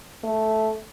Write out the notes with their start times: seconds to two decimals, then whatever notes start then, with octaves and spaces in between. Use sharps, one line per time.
0.24 A3